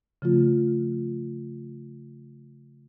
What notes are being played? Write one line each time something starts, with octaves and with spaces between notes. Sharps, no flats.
C#3 F3 A3 F4